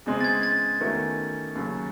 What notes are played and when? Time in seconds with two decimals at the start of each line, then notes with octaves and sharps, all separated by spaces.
0.06 E2 C#3 G#3 C4
0.21 A6
0.24 G#6
0.43 A6
0.80 E2 D#3 A3 C#4 F#4
1.55 D#2 C#3 F#3